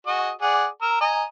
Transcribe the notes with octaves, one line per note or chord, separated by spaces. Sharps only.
F#4 G#4 D#5
G#4 D5 F#5
A#4 E6
D#5 G#5 A#5